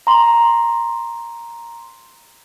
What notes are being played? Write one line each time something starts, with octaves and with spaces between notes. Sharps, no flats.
A#5 C6